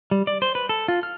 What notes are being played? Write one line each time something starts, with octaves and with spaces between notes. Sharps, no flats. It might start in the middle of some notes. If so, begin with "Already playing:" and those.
G3
D5
C5
B4
A4
F4
F6